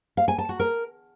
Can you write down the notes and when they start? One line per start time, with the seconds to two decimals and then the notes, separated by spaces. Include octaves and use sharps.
0.17 F5
0.28 G#5
0.38 A5
0.49 F#4
0.60 A#4